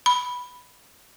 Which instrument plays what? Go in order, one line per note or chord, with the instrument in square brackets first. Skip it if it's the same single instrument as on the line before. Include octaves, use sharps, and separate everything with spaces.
[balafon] B5